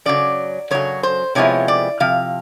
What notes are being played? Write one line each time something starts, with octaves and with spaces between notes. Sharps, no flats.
F#2 C#3 F#3 D5
F#2 C#3 F#3 C#5
C5
C3 F3 G#3 B3 E4 C#5
D5
C3 F3 F5